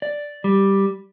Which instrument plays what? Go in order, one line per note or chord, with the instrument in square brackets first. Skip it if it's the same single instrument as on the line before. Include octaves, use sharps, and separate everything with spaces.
[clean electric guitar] D5
G3